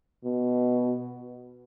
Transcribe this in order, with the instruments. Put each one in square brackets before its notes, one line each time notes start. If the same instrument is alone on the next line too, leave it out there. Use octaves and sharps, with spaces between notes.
[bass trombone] B2